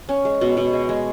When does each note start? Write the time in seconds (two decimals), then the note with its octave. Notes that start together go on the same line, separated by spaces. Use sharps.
0.09 C#4
0.25 G#3
0.41 B2
0.57 B2
0.73 G#3
0.89 G#3